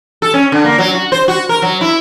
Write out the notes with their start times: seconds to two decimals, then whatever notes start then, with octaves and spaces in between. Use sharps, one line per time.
0.22 A4
0.34 C#4
0.52 D3
0.65 A#3
0.78 F#3
0.95 F#4
1.12 C5
1.28 F#4
1.49 A#4
1.62 F#3
1.81 E4